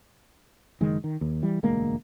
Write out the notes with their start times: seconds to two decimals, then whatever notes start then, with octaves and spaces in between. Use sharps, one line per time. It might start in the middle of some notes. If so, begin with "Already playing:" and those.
0.81 F#1 D#3 G#3
1.04 D#3
1.21 D#2
1.43 E3 G3
1.63 E1 D2 G#3 A#3